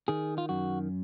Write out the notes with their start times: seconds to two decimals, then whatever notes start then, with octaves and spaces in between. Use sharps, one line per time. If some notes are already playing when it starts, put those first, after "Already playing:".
0.08 D#3 G#4
0.38 F4
0.49 F#2 F#4